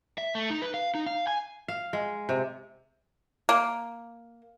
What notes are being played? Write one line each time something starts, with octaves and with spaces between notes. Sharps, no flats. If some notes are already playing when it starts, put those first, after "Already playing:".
E5
A3
D#4
B4
F5
D#4
F5
G#5
F5
G#3
C3
A#3